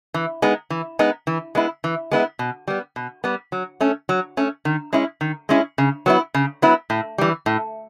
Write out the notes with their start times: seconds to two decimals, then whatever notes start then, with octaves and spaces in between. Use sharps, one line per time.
0.14 E3
0.42 G#3 B3 D#4
0.70 E3
0.99 G#3 B3 D#4
1.27 E3
1.55 G#3 B3 E4
1.84 E3
2.11 G#3 B3 E4
2.39 B2
2.68 G3 B3
2.96 B2
3.24 G3 B3
3.52 F#3
3.80 A3 C#4
4.09 F#3
4.37 A3 C#4
4.65 D#3
4.93 G#3 C#4 E4
5.21 D#3
5.49 G#3 C#4 E4
5.78 C#3
6.06 F#3 B3 E4
6.34 C#3
6.62 F#3 B3 E4
6.90 A2
7.18 E3 G3
7.46 A2